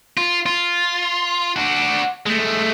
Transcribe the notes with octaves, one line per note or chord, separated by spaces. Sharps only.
F4
F4
D4 F#4
G#3 A3